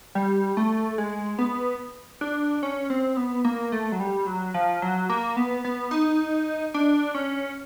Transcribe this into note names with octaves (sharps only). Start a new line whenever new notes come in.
G3
A3
G#3
B3
D4
C#4
C4
B3
A#3
A3
F#3
G3
F#3
F3
F#3
A#3
B3
B3
D#4
D4
C#4